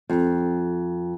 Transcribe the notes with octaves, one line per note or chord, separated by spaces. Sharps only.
F2